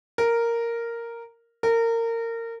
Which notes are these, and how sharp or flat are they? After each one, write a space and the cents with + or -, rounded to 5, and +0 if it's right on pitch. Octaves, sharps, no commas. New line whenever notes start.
A#4 -5
A#4 -25